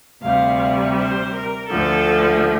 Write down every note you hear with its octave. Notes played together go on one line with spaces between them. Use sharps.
D2 C3 G3 F5
C5
A#4
D2 D3 F3 A4